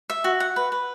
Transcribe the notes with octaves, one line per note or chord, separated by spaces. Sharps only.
E5
F#4
F#5
B4
B4